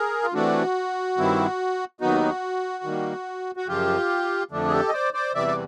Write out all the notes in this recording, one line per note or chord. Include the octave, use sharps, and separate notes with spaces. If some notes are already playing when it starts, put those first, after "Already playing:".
Already playing: G#4 A#4
F4
C3 E3 A3 D4 F#4
G2 D#3 G3 C4 E4
D#2 D#3 F#3 B3 D#4 F#4
D#3 G3 A#3
F#4
F#2 C#3 F3 F4 G4
F2 D3 F3 A3 D4
G#4
G4 A4
D#5
C5 D5
C5 D5
E2 C3 E3 G3 D5 E5
D5